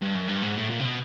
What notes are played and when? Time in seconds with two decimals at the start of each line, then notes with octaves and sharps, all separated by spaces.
0.02 G2
0.15 F#2
0.29 G2
0.43 G#2
0.57 A2
0.70 A#2
0.79 C3
0.85 B2